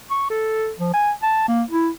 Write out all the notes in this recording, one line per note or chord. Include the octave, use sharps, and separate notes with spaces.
C#6
A4
F3
G#5
A5
A#3
E4